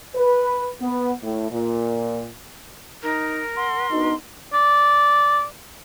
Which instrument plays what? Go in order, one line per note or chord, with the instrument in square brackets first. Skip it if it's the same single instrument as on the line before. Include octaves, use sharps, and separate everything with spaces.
[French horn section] B4
B3
A2
A#2
[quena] D#4 [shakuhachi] A#4
[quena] F#5 [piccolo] C6
[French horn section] B3 D4 D#4 [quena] F#4
[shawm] D5